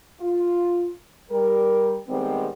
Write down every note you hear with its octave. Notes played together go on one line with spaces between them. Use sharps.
F4
G3 A#4
D#3 G3 G#3 B3 C4